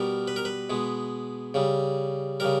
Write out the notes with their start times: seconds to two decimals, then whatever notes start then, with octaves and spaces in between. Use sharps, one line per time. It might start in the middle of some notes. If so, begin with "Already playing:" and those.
Already playing: B2 G3 A#4
0.28 B4
0.36 A#4
0.45 B4
0.70 B2 G#3
1.54 C#3 G3
2.40 C#3 G3 A#4